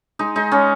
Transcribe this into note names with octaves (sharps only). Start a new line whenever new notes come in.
G#3 D#4
G#3 D#4
G#3 C#4